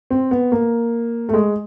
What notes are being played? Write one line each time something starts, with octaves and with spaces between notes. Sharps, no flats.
C4
B3
A#3
A3
G#3